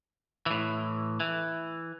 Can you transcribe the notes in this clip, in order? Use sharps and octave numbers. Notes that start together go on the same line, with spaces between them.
A2 E3
E3